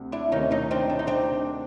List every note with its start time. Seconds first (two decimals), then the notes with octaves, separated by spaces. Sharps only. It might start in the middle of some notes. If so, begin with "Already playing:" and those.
Already playing: D2 C3
0.12 D4 E4
0.32 D2 C3 D#3 C#4 D#4
0.51 C#4 D#4
0.71 C4 D4
0.89 D4
0.99 D#4
1.07 C4 D4